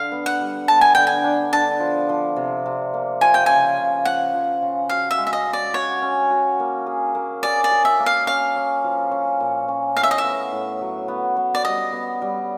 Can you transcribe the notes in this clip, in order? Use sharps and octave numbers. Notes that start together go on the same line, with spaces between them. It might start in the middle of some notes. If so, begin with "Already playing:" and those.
Already playing: D3 F5
B3
F#5
G3
B3 A5
G#5
D3 G5
G#5
D4
D4 A5
F3
F3
C3
C3
A#3
F3 G#5
G5
C#3 G#5
C#3
F3 F#5
F3
C#3
F#4 F5
E5
G#3
E5
D#5
G#3
D5
F#4 C#5
C#4
F#4
A#3
G#4
A#3
G#4 D5
D5
G#4
E5
A#3
F5
C#4 F5
C#4
F3
C#4
A#2
C#4
A2 F5
E5
D#5
E5
B3
A2
F#3
B3
B3
D5
G3 D#5
B3
G3